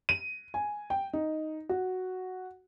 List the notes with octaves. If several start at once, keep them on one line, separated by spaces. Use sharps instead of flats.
D#7
G#5
G5
D#4
F#4